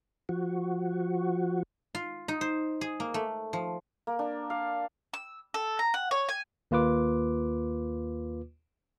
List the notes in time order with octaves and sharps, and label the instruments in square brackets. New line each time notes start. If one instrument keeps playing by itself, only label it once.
[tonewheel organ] F3 F#4
[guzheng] F4
D#4
C5
G#4
A#3
A3
F3
[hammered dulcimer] A#3
D4
F5
[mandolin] E6
A4
A#5
F#5
C#5
G#5
[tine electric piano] D#2 A#3 F4 B4 D6